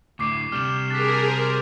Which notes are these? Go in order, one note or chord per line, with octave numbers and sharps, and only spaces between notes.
D2 A2 D3 C#6 D6 C7
C3 G3 F6 E7
D4 G#4 A#4 A6 B6
C5 F7